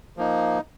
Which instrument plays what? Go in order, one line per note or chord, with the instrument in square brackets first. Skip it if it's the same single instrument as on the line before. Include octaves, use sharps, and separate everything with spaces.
[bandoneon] F3 A#3 D#4